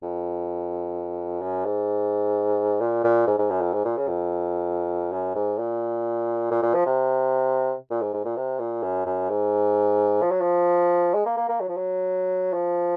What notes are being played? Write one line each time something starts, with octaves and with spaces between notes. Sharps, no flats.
F2
F#2
G#2
A#2
A#2
G#2
G#2
F#2
F2
G#2
A#2
C#3
F2
F#2
G#2
A#2
A#2
A#2
F3
C3
A#2
G#2
G#2
A#2
C3
A#2
F#2
F#2
G#2
F3
F#3
F3
G#3
A#3
A#3
A#3
F#3
F3
F#3
F3